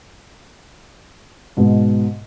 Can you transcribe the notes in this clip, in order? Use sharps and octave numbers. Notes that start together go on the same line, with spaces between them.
G#2 B2